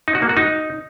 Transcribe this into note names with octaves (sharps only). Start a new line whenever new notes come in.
D#4
F#4
A#3
F#4
D#4